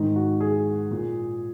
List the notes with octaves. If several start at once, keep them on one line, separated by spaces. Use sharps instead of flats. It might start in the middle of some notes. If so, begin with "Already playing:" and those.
Already playing: G#2 D#3 D#4
F#4
G#4
A#2